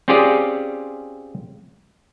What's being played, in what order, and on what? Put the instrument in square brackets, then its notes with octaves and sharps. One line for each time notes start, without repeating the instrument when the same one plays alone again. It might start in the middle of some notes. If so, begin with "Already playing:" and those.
[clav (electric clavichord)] C4 C#4 F4 G4 G#4 D5